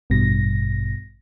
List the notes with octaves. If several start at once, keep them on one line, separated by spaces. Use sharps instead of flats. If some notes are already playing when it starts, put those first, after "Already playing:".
A1 G2 B2 A#6